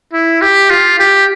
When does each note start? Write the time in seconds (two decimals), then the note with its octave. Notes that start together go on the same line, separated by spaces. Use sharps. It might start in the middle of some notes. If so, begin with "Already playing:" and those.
0.13 E4
0.41 G4
0.70 F4
0.99 G4